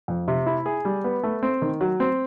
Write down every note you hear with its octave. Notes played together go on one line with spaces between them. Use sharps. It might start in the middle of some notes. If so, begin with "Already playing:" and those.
F2
C3
E4
G#4
G3
B3
A3
C4
D#3
F#3
C4